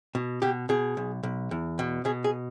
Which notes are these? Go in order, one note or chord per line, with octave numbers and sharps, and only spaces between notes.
B2
B2 G4
B2 G#4
B1
B1
E2
B2
B2 G#4
G#4